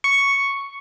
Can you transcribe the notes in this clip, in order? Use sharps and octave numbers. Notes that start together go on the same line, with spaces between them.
C#6